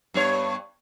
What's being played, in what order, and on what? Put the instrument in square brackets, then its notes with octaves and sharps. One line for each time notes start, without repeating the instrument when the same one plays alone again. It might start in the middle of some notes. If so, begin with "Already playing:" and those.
[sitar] G2 B3 C#5